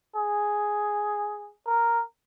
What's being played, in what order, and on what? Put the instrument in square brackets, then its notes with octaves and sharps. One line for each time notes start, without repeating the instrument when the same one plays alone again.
[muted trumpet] G#4
A#4